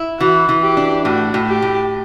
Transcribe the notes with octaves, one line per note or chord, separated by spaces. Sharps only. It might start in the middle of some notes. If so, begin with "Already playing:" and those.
Already playing: E4
E3 F#4
E3
G4
D4
A2 F#4
A2
G4
A2